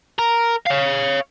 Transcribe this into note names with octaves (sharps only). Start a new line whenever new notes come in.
A#4
C#5 F5